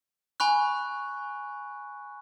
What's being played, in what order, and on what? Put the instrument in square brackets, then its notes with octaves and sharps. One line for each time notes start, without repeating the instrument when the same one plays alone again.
[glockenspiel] G#5 B5 C#6 F#6